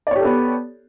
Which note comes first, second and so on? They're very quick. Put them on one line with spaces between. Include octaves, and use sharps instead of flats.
D5 C#5 G4 A4 B3